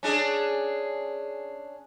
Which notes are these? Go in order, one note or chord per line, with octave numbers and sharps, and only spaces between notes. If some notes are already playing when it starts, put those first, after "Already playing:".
C#4 D4 G#4